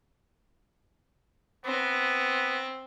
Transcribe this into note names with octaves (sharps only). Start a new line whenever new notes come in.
B3 C4